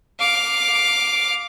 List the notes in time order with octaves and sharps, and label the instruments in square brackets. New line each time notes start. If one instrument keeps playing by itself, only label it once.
[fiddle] F5 D6